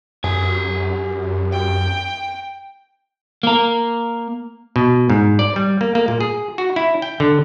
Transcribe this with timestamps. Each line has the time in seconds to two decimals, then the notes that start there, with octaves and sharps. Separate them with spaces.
0.24 F#2 G4 G#5
1.52 G5
3.43 A#3 A#4
4.76 B2
5.10 G#2
5.39 D5
5.56 G3
5.81 A#3
5.95 A#3
6.08 A#2
6.21 G#4
6.58 F#4
6.76 E4
7.02 G5
7.20 D3